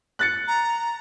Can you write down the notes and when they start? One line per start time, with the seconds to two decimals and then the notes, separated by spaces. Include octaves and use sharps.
0.19 F#6 A6 C#7
0.48 A#5